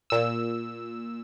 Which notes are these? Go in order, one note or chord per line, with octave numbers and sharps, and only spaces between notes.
A#2 E6